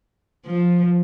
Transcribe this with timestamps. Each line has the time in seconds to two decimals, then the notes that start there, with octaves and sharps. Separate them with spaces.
0.46 F3